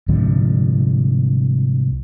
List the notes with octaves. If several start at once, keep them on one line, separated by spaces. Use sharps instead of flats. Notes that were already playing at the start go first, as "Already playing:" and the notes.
C2 G#2 D3 F3